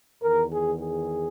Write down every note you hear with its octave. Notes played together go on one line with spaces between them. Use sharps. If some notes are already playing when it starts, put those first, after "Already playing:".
E2 D#3 A#4
G#4
G#4